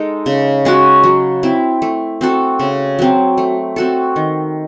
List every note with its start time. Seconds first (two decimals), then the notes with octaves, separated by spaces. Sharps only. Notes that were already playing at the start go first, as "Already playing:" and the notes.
Already playing: G#3 D#4 A4
0.26 C#3
0.65 G#3 C#4 F#4
1.04 F#3
1.43 C4 E4
1.82 A3
2.21 C4 F#4 A4
2.60 C#3
2.99 F#3 C4
3.38 A3
3.76 C4 F#4 A4
4.16 D#3